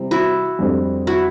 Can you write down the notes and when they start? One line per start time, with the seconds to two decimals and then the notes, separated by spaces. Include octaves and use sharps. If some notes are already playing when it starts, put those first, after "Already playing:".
Already playing: C3 E3 G3 C4
0.11 E4 F#4
0.59 F2 D3 G3 C4
1.07 E4 F#4